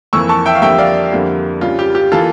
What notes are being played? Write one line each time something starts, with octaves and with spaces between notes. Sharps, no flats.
F2 E3 A#3 C#6 E6
A5 C#6
E5 G5
F5
F2 D3 G3 A#3 E5 G5
D5 F5
F2 D3 G3 A#3
C#2 C#3 G3 F4
G4
G4
E3 A#3 F4 A4